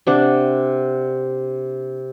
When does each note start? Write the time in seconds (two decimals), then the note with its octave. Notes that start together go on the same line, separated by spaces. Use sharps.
0.07 C3 D4 F#5